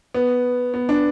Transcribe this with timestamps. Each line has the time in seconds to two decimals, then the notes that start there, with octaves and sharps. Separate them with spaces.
0.14 B3
0.74 B3
0.89 D4